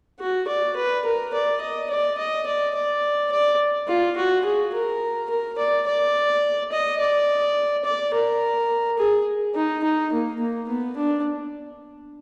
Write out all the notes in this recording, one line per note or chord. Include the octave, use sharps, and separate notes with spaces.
F#4
D5
B4
A#4
D5
D#5
D5
D#5
D5
D5
D5
F4
F#4
G#4
A#4
A#4
D5
D5
D#5
D5
D5
A#4
G#4
D#4
D#4
A#3
A#3
B3
D4